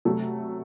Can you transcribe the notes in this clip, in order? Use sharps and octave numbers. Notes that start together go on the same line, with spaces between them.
C3 F#3 A3